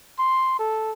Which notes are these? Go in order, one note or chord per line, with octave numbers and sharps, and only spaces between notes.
C6
A4